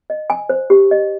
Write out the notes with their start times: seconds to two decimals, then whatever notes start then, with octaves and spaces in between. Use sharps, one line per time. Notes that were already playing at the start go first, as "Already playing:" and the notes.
0.10 D#5
0.30 G#5
0.49 C5
0.70 G4
0.91 D#5